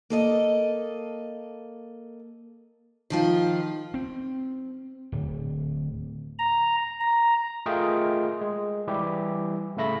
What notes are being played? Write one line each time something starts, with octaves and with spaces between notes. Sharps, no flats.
A#3 A4 D#5
D#3 F3 F4
C4
D1
A#5
A#5
A3 F4 G#4 A#4 D#5 G5
G#3
E3 G3 E4 G4
A2 C#3 A3 E5 B5 A#6